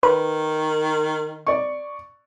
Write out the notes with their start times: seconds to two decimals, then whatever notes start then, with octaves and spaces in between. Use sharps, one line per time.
0.03 D#3 B4
1.47 D5 C#6